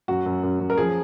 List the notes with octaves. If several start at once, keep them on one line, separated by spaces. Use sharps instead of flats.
F#2 F#4
F#2
F#2
F#2
A#4
F3 G#4